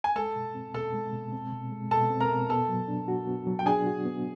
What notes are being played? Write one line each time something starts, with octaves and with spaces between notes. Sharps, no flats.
G#5
G#3 A4 A5
B2
C4
B2 A4 A5
G#3
B2
C4
B2
G#3
B2 A4 A5
C4
A#4 A#5
B2
B3 A4 A5
F#3
D4
F#4
B3
F#3
G5
D4 G#4 G#5
F#4
B3